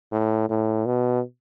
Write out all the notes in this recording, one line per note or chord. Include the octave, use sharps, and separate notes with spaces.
A2
A2
B2